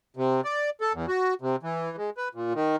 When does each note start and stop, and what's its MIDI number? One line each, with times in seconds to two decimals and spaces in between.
0.17 0.41 48
0.45 0.70 74
0.81 0.93 69
0.94 1.06 40
1.08 1.34 66
1.41 1.56 48
1.63 1.96 52
1.97 2.10 56
2.17 2.29 71
2.35 2.53 46
2.55 2.76 51